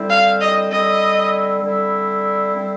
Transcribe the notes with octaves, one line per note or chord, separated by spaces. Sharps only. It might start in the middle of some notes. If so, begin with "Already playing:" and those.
Already playing: D3 G3 C4 E4
F5
D#5
D3 G3 C4 E4 D#5
D3 G3 C4 E4
D3 G3 C4 E4